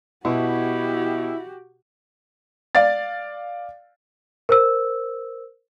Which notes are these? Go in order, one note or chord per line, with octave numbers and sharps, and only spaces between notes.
B2 E4 F#4 G4
D5 F5 A6
A#4 C5 E6